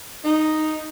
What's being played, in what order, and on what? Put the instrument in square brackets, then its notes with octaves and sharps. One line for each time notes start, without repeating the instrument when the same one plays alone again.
[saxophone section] D#4